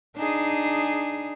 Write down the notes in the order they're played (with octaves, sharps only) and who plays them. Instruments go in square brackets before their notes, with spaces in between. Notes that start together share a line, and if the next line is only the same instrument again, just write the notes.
[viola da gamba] D4 D#4 G#4